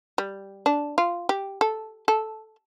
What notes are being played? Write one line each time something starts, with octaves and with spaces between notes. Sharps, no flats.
G3
D4
F4
G4
A4
A4